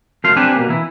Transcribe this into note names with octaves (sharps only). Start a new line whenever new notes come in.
F#2 A3 F5 C6
C4 D4 G4 B4 G#5
B2 A#3
E3 E4